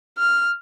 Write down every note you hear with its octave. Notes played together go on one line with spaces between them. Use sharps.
F6